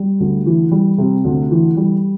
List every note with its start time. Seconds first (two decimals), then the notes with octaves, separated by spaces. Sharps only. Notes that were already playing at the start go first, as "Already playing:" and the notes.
Already playing: G3
0.20 D2
0.46 E3
0.72 G3
0.98 C3
1.24 D2
1.51 E3
1.77 G3